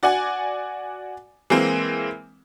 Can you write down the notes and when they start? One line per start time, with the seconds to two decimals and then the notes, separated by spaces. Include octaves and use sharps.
0.03 F#4 D5 F#5 G#5
1.50 E3 G#3 A#3 C4